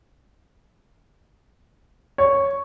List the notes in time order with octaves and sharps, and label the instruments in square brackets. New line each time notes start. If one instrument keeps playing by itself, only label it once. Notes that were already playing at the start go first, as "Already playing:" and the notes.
[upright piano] C#5